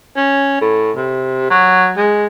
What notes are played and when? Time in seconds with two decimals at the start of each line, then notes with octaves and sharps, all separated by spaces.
0.16 C#4
0.61 A2
0.97 C3
1.50 F#3
1.97 G#3